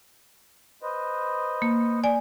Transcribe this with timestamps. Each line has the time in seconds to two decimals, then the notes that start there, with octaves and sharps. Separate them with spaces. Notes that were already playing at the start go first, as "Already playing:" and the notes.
0.82 B4 C5 D#5
1.62 A#3
2.04 D5 G#5